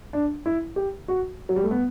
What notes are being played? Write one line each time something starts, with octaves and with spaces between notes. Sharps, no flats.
D4
E4
G4
F#4
F#3
G3
A3
B3